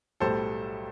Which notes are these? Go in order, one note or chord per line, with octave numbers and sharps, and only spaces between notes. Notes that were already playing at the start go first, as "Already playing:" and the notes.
B1 A2 G3 A4 C5